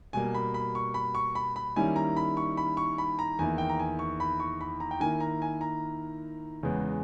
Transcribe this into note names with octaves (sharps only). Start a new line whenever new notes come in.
B2 G3 A#3 G#5
B5
B5
C#6
B5
C#6
B5
B5
D#3 G3 A#3 C#4 E4 G#5
A#5
B5
C#6
B5
C#6
B5
A#5
E2 D#3 A#3 E4 G#5
G5
A#5
G#5
C#6
B5
C#6
B5
A#5
G5
D#3 A#3 E4 G#5
A#5
G#5
A#5
E2 C#3 G#3 B3